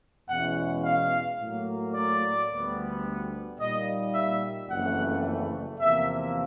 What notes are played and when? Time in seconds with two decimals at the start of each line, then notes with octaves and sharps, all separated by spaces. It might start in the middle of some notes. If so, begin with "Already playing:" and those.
0.29 E2 B2 G#3 C#4 E4 F#5
0.84 F5
1.40 A2 F#3 A#3
1.95 D5
2.50 D2 D3 G3 B3
3.60 A#2 G3 A#3 D#4 D#5
4.14 E5
4.70 F#1 F2 C#3 E3 A3 F#5
5.80 E2 C3 F3 A#3 E5